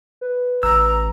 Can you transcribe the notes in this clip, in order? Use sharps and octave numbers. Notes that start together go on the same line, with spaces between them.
B4
A1 A#5 E6